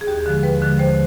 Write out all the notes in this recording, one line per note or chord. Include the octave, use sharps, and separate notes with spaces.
G#4
D#2 G4
D3 F3 G#3
D#2 B4
D3 F3 G#3
D#2 C5